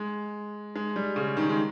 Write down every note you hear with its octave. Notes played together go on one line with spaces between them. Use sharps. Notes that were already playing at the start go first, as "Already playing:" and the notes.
Already playing: G#3
G#3
G3
C#3
D#3
G#3